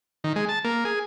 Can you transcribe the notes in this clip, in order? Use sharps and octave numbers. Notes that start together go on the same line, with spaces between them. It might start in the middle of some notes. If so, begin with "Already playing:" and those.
D#3
G#3
A5
A#3
G#4